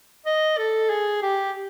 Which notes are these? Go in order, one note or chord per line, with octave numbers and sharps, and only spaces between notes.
D#5
A4
G#4
G4